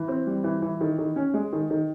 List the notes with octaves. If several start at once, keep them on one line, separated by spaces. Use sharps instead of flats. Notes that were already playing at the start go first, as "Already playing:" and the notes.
Already playing: E3
C4
G3
E3
E3
D#3
D#3
C#4
G#3
D#3
D#3